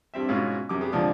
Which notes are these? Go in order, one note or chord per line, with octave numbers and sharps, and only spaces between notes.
G2 G3 C4 E5
G#2 B2 G#3 C#4 E4 F4
F#2 C3 D6
B3 G4 G#4
C2 D3 F3 G#3 D5 D#6